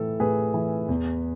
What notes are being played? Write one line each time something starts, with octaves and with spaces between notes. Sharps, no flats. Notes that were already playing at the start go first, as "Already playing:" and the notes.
Already playing: A2 E3 A4
A2 G#4 B4
E3
E2